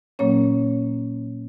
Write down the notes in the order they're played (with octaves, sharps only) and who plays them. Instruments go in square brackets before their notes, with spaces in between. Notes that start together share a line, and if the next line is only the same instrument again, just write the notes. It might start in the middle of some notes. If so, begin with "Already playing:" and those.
[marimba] A#2 F#3 A#3 C#4 C#5